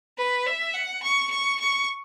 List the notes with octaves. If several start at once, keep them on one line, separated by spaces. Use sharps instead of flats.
B4
E5
F#5
C#6
C#6
C#6